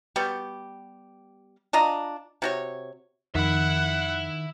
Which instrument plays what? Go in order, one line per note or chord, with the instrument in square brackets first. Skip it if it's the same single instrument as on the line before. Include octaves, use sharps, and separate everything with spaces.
[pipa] G3 B3 F#4 G4
D4 F4 D#5 A#5
C3 F#4 C#5
[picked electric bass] F2 [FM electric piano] D#3 [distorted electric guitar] E5 B5 [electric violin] F#5